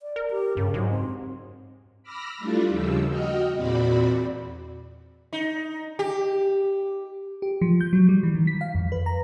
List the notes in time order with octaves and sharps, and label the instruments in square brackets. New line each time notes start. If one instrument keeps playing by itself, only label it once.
[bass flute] D5
[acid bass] A#4
[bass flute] G4
[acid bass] G2 [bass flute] C#3
[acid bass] G#2 [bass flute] F#3
[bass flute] C4
[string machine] B5 D6 E6 F6 A#6
G3 A3 D4 E4 F4
D#2 C#3 F3 G3 E6
F#4 D#5 G5 F6
E2 A#2 C4 F#4 D5 B5
[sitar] D#4
G4
[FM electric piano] G4
F3
G6
F#3
G3
E3
D#3
B6
F5
F2
B4
A#5